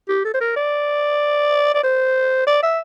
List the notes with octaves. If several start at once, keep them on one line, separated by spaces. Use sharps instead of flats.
G4
A4
C5
A#4
D5
D5
C5
D5
E5